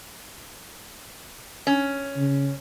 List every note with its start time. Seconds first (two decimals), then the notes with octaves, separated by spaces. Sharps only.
1.67 C#4
2.17 C#3